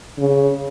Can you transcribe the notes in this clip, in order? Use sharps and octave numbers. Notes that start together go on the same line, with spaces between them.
C#3